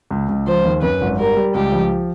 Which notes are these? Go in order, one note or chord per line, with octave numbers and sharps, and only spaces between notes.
C#2
C#2
F3 C5
D#2
F#2 B4
G#1
G3 A#4
G3
C#2 G4
F3